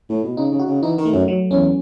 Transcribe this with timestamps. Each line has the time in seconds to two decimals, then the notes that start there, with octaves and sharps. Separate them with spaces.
0.10 A2
0.24 B2
0.37 C#3 D#4
0.52 C#3
0.59 F#4
0.68 C#3
0.82 E3 D#4
0.98 D#3
1.05 A3
1.13 F#2
1.28 F#3
1.51 E2 C#4